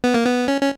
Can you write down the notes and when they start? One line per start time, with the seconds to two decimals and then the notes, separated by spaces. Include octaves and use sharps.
0.04 B3
0.14 A#3
0.25 B3
0.48 C#4
0.61 C#4